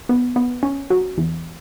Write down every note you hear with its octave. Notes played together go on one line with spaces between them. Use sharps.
B3
B3
C#4
F#3
E2